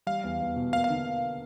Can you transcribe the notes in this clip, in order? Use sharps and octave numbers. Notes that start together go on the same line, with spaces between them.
G3 F5
E2
E2
B2
A#3 F5
F5
D3